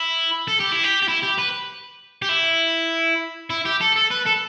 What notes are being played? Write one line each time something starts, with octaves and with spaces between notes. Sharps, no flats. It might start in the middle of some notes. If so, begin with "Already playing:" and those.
Already playing: E4
A4
G4
E4
G4
G4
E4
G4
B4
G4
E4
E4
G4
A4
A4
B4
A4